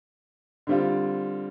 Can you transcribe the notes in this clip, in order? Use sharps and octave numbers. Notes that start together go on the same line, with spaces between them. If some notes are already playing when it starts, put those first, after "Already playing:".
D3 G3 C4 F4